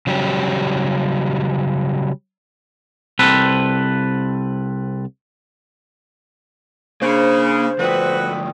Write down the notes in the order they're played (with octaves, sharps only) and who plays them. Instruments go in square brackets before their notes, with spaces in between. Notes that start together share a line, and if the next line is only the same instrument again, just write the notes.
[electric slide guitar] C#3 F#3 G3 G4
[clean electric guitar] C2 C4 A4 B4
[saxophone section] C#3 [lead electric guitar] A#3 [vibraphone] D4 G#4 B5 [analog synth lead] C5
[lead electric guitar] D2 F3 [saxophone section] F#4 A4 B4 [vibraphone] D5 G5 D#6